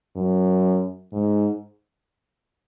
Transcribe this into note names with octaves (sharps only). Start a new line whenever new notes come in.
F#2
G#2